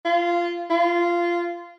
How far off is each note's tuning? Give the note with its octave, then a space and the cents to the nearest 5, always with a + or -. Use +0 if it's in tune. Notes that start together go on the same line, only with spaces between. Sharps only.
F4 -15
F4 -15